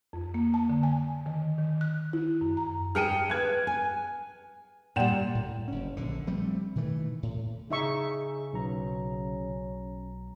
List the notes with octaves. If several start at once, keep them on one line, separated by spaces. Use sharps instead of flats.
F2
A#3
A5
D3
G#5
D#3
D#3
F#6
E4
F#2
A#5
G#4 G5 A5 F6 C#7 D#7
B4 F5 F#6 G#6
G#5
A#2 G3 F#5 G5 E7
A2
F#1 C#4
A#1 D3
F3 G3 A3 C4
B2 D#3 E3 A3
A2
C#3 D#4 G#4 E5 C#6
B1 C#4 A#5